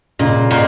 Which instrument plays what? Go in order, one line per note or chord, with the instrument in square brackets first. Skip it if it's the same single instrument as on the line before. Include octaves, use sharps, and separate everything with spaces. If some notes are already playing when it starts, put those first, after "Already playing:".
[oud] A#2 [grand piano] C#3
[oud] A#2